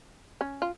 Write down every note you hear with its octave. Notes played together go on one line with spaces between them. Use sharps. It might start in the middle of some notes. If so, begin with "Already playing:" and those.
C#4
F4